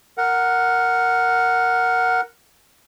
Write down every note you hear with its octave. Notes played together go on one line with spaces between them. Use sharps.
A#4 F#5